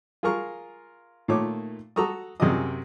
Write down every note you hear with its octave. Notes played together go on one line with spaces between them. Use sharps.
F4 G#4 A#4 A#5 C#6
A#2 D#3 A3 C#5 D6
F#4 A4 A#5 C#6 D#6
F#2 C3 G#4 D5 D#5 D#6